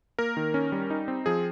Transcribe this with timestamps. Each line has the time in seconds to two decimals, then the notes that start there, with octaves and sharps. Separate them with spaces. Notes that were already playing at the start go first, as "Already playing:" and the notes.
0.19 A#3 A#4
0.37 D#3
0.54 C#4
0.72 G3
0.90 D#4
1.08 C4
1.26 F3 G#4